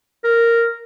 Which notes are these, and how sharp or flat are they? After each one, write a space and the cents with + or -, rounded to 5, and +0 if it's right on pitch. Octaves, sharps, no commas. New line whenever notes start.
A#4 -5